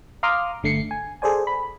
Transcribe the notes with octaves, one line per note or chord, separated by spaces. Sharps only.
F5 A#5 C6 D6 D#6 F6
G1 D3 A3 C7 C#7
G#5
G#4 A4 C5 D5 G#5
B5